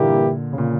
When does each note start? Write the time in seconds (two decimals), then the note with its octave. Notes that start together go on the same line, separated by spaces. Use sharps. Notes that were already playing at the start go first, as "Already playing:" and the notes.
Already playing: G2 A#2 D3 E3 A#3 E4 G4
0.53 C#3
0.58 A#2